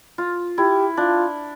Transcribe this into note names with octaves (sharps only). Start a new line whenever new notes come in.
F4
E4 G4
D4 F4